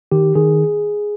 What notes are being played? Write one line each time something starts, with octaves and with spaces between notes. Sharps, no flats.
D#3 G4
D#3 G#4